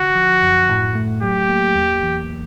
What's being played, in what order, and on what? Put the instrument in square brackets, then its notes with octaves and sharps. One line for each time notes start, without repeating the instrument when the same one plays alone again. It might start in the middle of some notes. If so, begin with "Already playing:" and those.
Already playing: [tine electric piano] D3 [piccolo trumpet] F#4
[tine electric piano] F3
F#2
A2
A3
[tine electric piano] F#3 [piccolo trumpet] G4
[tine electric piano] A#3
E2
E3